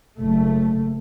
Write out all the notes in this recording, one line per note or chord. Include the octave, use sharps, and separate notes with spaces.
F#1 A3